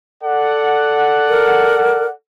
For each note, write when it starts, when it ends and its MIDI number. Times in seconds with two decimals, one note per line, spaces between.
0.24 2.12 69
0.24 2.12 74
0.24 2.12 78
1.29 2.06 70